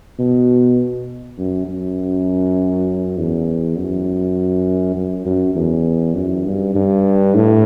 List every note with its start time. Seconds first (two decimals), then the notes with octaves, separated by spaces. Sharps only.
0.19 B2
1.38 F#2
1.67 F#2
3.17 E2
3.77 F#2
4.95 F#2
5.25 F#2
5.55 E2
6.16 F#2
6.45 G2
6.75 G2
7.35 A2